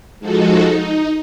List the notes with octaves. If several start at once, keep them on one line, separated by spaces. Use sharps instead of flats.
F3 G#3 D#4 F#4 A4
D#4